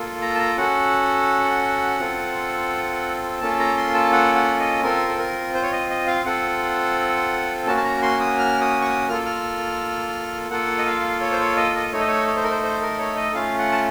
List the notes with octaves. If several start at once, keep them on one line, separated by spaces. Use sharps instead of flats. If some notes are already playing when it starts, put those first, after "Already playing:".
Already playing: A#3 F4 A4
A#5
A5
A#5
C#4 F#4 A4 F#5
C4 F4 A4
A#3 C#4 F4 A4 A5
A#5
C6
A5
F#5
F#5
D#5
C4 F4 A4 A#4
A4
A#4
C5
C#5
D#5
D#5
F5
C4 F4 A4 F#5
A#3 C#4 F#4 A5
A5
A#5
C6
D#6
F6
D#6
C#6
D#6
A#3 F4 A4 F6
F6
A#3 F4 A4 F#5
D#5
F5
C#5
C5
C#5
D#5
D#5
A3 D#4 A4 C#5
D#5
C#5
C#5
C5
A#4
C5
C5
A#4
C#5
D#5
A3 C#4 F4 F5
F#5
A5